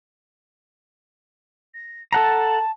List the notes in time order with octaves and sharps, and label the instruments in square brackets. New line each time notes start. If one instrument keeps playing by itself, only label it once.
[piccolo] A#6
[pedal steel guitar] A4 F#5 A#5 [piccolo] A5